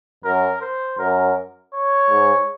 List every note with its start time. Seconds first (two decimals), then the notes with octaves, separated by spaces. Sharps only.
0.25 F#2 A#4
0.61 C5
0.99 F#2 A#4
1.73 C#5
2.10 G#2